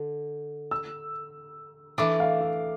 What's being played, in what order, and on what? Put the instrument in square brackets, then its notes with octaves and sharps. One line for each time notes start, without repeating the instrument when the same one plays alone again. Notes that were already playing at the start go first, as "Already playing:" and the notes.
Already playing: [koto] D3
[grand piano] E6
[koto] E3 A3 D4 [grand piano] D6
[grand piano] F5
E5